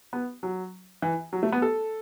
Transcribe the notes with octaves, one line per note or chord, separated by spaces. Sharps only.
B3
F#3
E3
F#3
A3
B3
A4